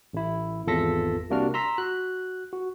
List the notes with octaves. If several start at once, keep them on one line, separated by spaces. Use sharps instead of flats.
A1 E4
G#1 E2 F4 A4 A#6 B6
C2 C3 A#3 D4 F#4 F6
A#5 C6 E6 B6
F#4 F#6
F#4